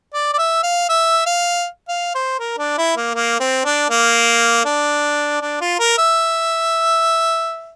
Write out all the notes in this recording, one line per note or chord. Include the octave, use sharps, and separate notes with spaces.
D5
D5
E5
F5
E5
F5
F5
C5
A#4
D4
E4
A#3
A#3
C4
D4
A#3
D4
D4
F4
A#4
E5